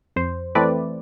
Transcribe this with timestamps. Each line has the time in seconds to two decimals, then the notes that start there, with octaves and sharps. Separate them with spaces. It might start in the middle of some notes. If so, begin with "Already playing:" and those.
0.16 F2 C5
0.55 E3 A3 C4 B4 D5